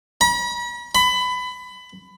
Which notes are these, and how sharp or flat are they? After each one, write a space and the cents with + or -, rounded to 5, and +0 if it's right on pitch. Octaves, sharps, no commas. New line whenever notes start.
B5 -45
B5 +20